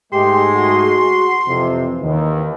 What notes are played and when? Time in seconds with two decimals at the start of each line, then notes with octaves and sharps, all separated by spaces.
0.13 G#2 G#3 A3 G4 G#4 C6
0.55 F#4
1.48 F2 C3 E3
2.02 D#2 D#3